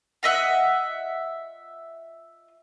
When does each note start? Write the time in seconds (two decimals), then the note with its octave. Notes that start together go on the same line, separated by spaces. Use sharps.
0.23 F4 D#5 E5 F#5